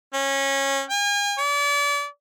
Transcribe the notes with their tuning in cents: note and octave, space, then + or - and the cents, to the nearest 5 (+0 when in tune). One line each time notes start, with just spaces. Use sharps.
C#4 -20
G#5 -40
D5 -35